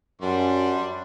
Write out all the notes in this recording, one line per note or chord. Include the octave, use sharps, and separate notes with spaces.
F#2 G3 D4 C6